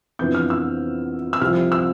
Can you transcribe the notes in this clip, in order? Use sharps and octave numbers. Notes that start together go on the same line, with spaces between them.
F2 C3 E3 B3 D4 G6
F6
E6
E6
C2 C3 F3 F6
E6